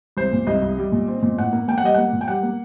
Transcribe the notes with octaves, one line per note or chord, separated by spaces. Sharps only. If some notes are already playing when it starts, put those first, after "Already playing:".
C2 C5
A#2
C2 D#5
C2
G3
A#2
C4
A#2
A2 F#5
A#3
A#3 G5
F#5
G3 D#5
A#3 F#5
A#2
G5
G3 F#5
A#3